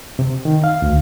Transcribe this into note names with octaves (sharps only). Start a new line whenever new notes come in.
C3
D#3
F5
D2